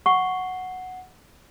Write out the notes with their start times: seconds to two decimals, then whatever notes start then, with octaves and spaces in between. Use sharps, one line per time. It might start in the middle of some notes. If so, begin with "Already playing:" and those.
0.06 F#5 C#6 C7 G7